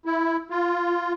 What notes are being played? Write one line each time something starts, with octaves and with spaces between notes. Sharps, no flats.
E4
F4